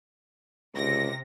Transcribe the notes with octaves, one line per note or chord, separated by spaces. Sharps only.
C#2 C3 A#6